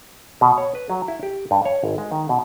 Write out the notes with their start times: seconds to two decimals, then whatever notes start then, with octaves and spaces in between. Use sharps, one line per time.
0.41 B2
0.58 C#5
0.75 B4
0.90 F#3
1.08 E4
1.23 G4
1.51 G2
1.65 C#5
1.84 G#1
1.98 G#3
2.11 D#3
2.29 B2